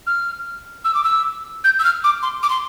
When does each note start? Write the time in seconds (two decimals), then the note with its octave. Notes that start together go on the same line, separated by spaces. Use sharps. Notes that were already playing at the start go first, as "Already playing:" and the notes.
0.07 F6
0.85 E6
0.94 D6
1.04 E6
1.64 G6
1.79 E6
1.84 F6
2.04 D6
2.22 C6
2.43 D6
2.50 C6